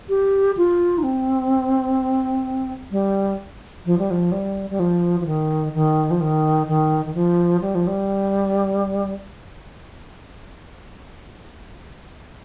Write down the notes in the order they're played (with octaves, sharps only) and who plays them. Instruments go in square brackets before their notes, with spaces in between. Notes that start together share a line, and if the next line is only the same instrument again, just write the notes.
[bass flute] G4
F4
D#4
C4
G3
F3
G3
F3
G3
G3
F3
F3
D#3
D#3
F3
D#3
D#3
D#3
F3
G3
F3
G3